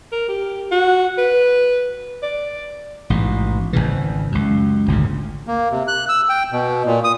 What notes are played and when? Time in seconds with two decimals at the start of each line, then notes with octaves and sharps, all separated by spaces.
0.12 A#4
0.29 G4
0.71 F#4
1.18 B4
2.23 D5
3.10 A1 G#2 B2
3.73 G#1 D#2 C#3 E3
4.32 C#2 F#2
4.88 G#1 D2 A#2 C#3
5.47 A#3
5.71 C3
5.88 F#6
6.09 E6
6.29 G5
6.52 B2
6.85 A#2
7.04 D#6